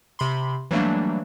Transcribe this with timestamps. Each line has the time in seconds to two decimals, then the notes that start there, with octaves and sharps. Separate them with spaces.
0.19 C3 B5 C6
0.71 E3 F#3 G3 A3 A#3 D4